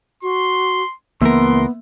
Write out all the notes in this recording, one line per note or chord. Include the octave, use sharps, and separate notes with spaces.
F#4 C6
C#2 E3 A#3 B3 A#4 C6